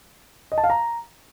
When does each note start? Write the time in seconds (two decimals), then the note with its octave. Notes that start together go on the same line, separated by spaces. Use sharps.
0.52 D#5
0.58 A5
0.64 F5
0.70 A#5